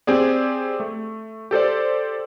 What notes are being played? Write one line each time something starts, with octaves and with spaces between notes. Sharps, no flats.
C4 G4 G#4 D5
A3
G4 A4 C5 D5